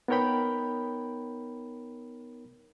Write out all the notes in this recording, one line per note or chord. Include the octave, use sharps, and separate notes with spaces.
B3 D#4 A#4 C#5 G5 B5